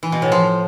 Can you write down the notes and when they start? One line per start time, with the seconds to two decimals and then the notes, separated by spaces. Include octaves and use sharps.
0.03 E3
0.12 B2
0.22 A2
0.32 F3